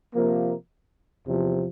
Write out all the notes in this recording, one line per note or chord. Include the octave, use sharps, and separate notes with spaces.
C3 F3 A#3
E2 C3 F3